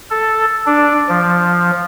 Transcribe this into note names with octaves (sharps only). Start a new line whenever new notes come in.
A4
D4
F3